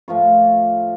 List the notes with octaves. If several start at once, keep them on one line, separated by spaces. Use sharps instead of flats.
A2 F3 F4 C#6